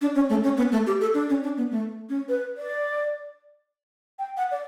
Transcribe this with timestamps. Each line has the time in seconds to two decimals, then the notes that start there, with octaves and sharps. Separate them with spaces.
0.01 D4
0.15 C#4
0.30 A3
0.44 C#4
0.57 B3
0.72 A3
0.87 G4
1.01 A4
1.14 D4
1.29 C#4
1.43 D4
1.57 B3
1.71 A3
2.09 C#4
2.29 B4
2.57 D5
4.19 G5
4.37 F#5
4.51 D5